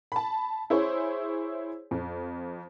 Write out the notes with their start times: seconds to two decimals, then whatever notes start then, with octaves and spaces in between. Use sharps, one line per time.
0.12 A5 B5
0.70 E4 G#4 C5 C#5
1.91 F2